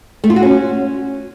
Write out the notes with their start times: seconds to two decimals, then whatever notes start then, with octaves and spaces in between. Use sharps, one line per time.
0.24 A3
0.30 F4
0.36 F#4
0.42 C#4